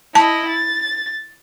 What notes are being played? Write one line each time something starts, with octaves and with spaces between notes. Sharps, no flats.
E4 D#5 A5
A6